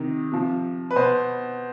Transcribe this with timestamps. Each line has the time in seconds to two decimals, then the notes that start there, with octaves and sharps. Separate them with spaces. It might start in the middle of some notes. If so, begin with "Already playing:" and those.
Already playing: C3 D#3
0.32 C3 F3
0.91 B4
0.96 B2 C5